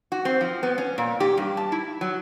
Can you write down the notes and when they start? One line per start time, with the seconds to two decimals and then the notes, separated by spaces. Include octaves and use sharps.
0.12 F#4
0.25 C4
0.41 F3
0.63 B3
0.78 C#4
0.98 A#2
1.20 G4
1.37 G2
1.57 A5
1.72 E4
2.01 F#3